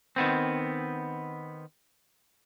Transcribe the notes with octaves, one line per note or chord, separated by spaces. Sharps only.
D#3 B3 C4